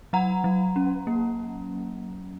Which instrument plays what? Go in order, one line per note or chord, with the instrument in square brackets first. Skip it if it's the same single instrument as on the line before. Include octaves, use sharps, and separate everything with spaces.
[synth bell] F#3 F#5 A#5
F#3
C#4
A#3